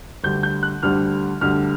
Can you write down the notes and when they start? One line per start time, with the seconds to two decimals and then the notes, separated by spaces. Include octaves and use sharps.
0.24 D2 D3 G3 G6
0.43 G6
0.63 F#6
0.83 D2 D3 G3 F6
1.41 D2 D3 G3 F6